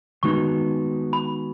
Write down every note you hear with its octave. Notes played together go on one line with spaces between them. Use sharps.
D#3 G#3 B3 D#4 F#4 C#6
B5